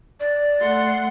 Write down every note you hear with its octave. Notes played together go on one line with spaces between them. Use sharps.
D5
A3 F#5 C6